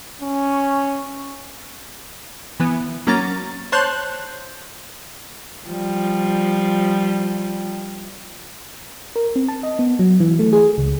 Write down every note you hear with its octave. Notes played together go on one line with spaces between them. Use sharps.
C#4
E3 B3
F#3 A#3 C#4 A#5 A6
C5 C#5 A5 C6 F#6 G6
F3 G3
A#4
C4
A5
D#5
B3
F#3
E3
A3
G#4
C#2